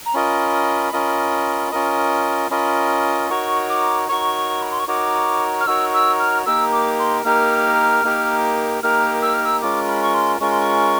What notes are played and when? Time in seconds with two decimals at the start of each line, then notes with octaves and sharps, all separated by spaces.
0.05 A#5
0.14 C#4 F4 A#4 D#5 B5
0.93 C#4 F4 A#4 D#5
1.72 C#4 F4 A#4 D#5
2.50 C#4 F4 A#4 D#5 B5
3.30 D#4 F#4 A#4 C#5 C#6
3.69 D6
4.08 D#4 F#4 A#4 C#5 C#6
4.62 B5
4.71 C6
4.79 C#6
4.87 D#4 F#4 A#4 C#5 D6
5.60 F6
5.67 D#4 F#4 A#4 C#5 E6
5.93 E6
6.19 F6
6.46 A#3 D#4 G4 A#4 E6
6.72 D6
6.99 C6
7.24 A#3 D#4 G4 A#4 F6
8.04 A#3 D#4 G4 A#4
8.83 A#3 D#4 G4 A#4 F6
9.22 E6
9.34 F6
9.45 E6
9.61 G#3 C#4 F4 A#4 D6
9.88 B5
10.02 C#6
10.14 C6
10.40 G#3 C#4 F4 A#4 C#6
10.50 C6
10.60 C#6